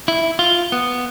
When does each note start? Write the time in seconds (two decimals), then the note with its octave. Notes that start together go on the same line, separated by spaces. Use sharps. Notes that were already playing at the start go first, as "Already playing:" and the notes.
0.08 E4
0.39 F4
0.72 B3